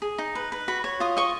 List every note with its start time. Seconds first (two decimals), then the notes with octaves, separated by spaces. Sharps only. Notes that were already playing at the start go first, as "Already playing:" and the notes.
0.02 G#4
0.18 D#4
0.35 B4
0.52 B4
0.68 F#4 B5
0.84 C#5
1.00 F4 D#6
1.17 D#5 C#6